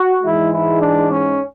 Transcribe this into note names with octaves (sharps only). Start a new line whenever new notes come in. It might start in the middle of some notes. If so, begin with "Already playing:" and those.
Already playing: F#4
G#2 E3 G#3 E4
E4
D4
C#4